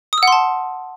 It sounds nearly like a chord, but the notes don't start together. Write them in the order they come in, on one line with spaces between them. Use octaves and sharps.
D#6 E6 F#5 C6 A5